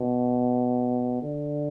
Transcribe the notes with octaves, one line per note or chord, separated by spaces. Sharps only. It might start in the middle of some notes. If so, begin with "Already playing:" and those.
Already playing: B2
D3